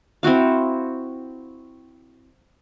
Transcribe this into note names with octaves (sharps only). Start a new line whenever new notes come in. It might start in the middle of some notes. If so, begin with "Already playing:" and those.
C4 E4 F#4 F5